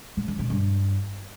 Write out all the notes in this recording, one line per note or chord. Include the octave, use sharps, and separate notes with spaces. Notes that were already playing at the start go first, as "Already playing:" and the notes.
A2
F2
B2
G2